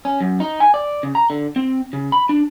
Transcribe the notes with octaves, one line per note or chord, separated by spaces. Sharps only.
C#4
F#2
D#4
G#5
D5
C#3
A#5
D3
C4
C#3
B5
D4